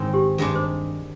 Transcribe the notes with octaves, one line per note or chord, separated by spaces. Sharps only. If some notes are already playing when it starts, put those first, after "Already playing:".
Already playing: G#2 D#3 G#3 C4 D#4
G4
G2 D#3 G#3 D4 G#4
C5